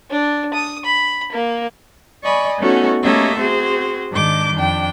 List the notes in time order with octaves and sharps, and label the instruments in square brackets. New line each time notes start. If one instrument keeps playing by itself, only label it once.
[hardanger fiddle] D4
D#6
B5
A#3
[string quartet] D5 D#5 G#5 B5 C#6
A3 B3 C#4 D#4 F#4 A4
A3 A#3 C#4 G4 D#5 E5
C4 F#4 G#4 C5
G#2 D#3 D4 D6 G6
F2 D4 G5